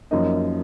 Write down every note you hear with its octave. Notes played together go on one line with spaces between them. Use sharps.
F#2 F3 A#3 D#4 D#5